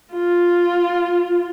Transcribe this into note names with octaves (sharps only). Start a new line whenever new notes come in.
F4